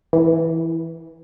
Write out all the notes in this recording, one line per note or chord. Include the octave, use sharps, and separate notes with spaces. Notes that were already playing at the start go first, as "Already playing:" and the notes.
E3